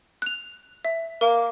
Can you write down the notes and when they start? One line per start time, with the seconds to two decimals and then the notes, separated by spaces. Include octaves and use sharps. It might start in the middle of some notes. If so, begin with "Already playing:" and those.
0.22 F#6 F7
0.85 E5
1.21 A#3 A#4